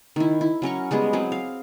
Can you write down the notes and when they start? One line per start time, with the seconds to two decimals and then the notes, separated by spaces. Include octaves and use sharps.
0.16 D#3 E4
0.41 E4
0.62 F#3 C#4 A#4 C#6
0.91 G3 G#3 B3 G#4
1.13 F#3 C4 G#4
1.32 F5